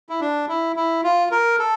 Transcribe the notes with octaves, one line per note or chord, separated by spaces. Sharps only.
E4
D4
E4
E4
F4
A#4
A4